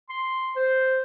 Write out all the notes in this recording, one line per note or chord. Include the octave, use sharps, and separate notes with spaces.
C6
C5